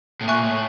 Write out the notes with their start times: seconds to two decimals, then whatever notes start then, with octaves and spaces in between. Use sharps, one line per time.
0.21 A2
0.27 A#2 E5 G#5 C#6 F#6
0.43 A2